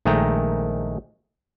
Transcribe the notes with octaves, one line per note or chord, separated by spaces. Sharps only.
A#1 D#3 G#3 A3 G5 A#5